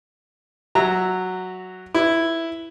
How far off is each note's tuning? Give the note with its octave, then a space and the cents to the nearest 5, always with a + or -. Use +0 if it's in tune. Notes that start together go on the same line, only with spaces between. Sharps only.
F#3 +0 E5 -10 A#5 -20
E4 +0 B4 +0